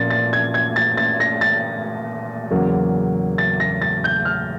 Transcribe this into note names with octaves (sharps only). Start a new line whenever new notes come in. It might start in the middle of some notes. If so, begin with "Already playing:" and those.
Already playing: A#2 F3 A#3 C#4 A6
A6
G#6
G#6
A6
A6
A#6
A6
E2 C#3 F#3 A#3
A6
A#6
A6
G6
F6